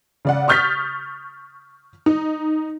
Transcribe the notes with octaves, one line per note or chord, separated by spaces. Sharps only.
C#3 D5 F#5
C#6 D#6 F6 G6 A6 B6
D#4